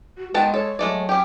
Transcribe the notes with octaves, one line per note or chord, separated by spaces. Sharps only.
F#4
D#3 G#3 B3 G5 A5
A4 C#5
F#3 G#3 A3 D5
C#4 G4 D6